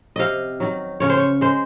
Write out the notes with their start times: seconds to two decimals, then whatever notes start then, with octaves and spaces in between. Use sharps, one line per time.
0.16 C3 D#5 F5
0.60 D#3 F#3
1.00 C#3 C#5
1.10 C5
1.17 C#5
1.41 G#3 C5